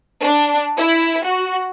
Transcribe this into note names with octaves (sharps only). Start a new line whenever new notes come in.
D4
E4
F#4